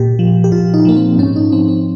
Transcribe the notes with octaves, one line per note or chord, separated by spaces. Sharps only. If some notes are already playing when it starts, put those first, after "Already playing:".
Already playing: A#2 G4
F3
G4
A#2 F4
D#4
F3 A#3
C4
G#2 C#4
D#4
F3 C4
C4